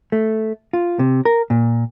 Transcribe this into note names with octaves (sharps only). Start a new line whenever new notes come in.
A3
F4
C3
A#4
A#2